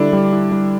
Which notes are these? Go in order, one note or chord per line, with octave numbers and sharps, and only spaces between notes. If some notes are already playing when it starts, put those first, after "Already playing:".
Already playing: D3 G3 D4 E4
G3
E4
G3